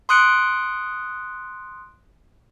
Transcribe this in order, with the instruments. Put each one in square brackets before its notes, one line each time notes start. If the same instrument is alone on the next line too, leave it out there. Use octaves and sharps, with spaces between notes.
[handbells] C6 D#6 F#6 C#7 D7